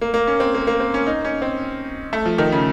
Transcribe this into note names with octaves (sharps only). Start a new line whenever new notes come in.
A#3
A#3
C#4
C4
A#3
A#3
C4
C#4
D#4
C#4
C4
A3
F3
D#3
C#3